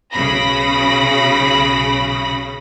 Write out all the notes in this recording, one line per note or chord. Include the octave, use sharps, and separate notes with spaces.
B1 C#3 B5 A#6